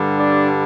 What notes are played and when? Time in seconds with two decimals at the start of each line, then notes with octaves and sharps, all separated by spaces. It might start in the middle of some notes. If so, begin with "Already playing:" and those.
Already playing: G2 D3 G3
0.17 D4